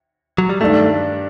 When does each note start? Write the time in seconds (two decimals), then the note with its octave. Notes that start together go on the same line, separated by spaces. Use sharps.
0.38 F#3
0.49 G3
0.61 G2 D#3 G3 A3 D4